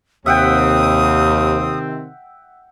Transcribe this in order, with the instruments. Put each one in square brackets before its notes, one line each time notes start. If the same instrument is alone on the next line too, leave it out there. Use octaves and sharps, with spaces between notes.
[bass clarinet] D#2 [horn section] C3 D#3 C4 [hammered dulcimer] E5 F#5 G5 [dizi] D#6